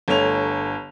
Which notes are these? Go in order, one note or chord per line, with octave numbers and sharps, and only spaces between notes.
G1 A3 C#5 F7